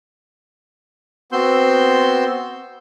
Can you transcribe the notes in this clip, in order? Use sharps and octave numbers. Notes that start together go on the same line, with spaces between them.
B3 C4 F#4 C6 E6 G6